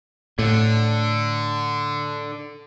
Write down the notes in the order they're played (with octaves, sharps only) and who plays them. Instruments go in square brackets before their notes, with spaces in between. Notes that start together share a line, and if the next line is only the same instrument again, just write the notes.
[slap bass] A2 [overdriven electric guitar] D3